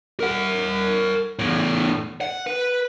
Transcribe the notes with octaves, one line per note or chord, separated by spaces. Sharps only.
A#4 F#5
E2 A2
F#5
B4